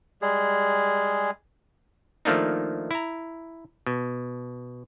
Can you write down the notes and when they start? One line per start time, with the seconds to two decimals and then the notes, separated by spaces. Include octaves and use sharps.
0.22 G3 G#3 G#4
2.25 D#3 F3 A3 A#3 D4 D#4
2.91 E4 A#5
3.87 B2